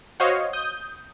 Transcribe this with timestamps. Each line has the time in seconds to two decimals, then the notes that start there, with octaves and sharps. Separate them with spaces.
0.20 F#4 C5 C#5 D#5 F5
0.53 D#6 G6